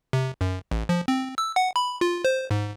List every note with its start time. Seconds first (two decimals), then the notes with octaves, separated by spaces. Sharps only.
0.13 C3
0.41 F#2
0.71 A1
0.89 F3
1.08 C4
1.38 E6
1.56 F#5
1.76 B5
2.01 F4
2.25 C5
2.51 G#2